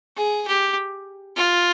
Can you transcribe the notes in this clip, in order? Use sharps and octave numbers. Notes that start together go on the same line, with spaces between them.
G#4
G4
F4